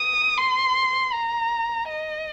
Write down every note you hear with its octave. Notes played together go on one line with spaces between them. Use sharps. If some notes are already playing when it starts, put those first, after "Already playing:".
Already playing: D#6
C6
A#5
D#5